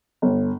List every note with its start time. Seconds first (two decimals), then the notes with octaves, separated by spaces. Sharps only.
0.22 G1